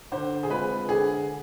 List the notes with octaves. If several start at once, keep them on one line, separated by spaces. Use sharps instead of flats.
D3 C5
G#4
G#3 C4 F4 B4
D3 G#4